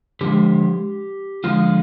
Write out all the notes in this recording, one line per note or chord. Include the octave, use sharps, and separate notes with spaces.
D3 F3 G#3 G4
D3 F3 G#3 F4